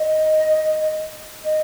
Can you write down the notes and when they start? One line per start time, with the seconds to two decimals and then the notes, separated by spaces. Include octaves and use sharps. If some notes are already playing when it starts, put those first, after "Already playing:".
Already playing: D#5
1.44 D#5